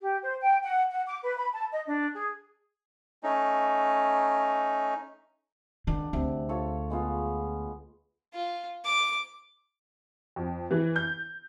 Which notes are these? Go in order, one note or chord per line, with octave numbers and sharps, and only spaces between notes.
G4
C5
G5
F#5
F#5
D6
B4
B5
A5
D#5
D4
G#4
A3 C#4 D#4
D#3 D4 F#5
D2 C3
F4 A4 C#5
G#3 B3 F4
F4
D6
F2
E3
G6